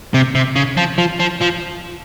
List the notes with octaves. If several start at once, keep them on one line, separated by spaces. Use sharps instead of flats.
C3
C3
C#3
F3
F3
F3
F3